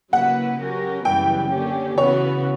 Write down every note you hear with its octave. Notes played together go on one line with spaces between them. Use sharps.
C#3 F#3 A#3 E4 B4 F#5
F#3 C#4 G4 A#4
F#2 C#3 E3 G3 B3 G5
D3 A#3 C#4 G4
C#3 E3 B3 F#4 C#5